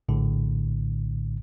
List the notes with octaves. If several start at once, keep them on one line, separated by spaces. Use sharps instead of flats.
A#1 A2 D3